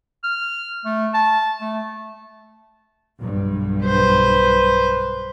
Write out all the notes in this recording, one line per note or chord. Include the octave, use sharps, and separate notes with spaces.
F6
A3
A5
A3
B1 G2
B4 C5